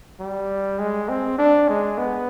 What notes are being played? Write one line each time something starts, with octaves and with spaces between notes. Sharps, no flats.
G3
G#3
C4
D4
G#3
B3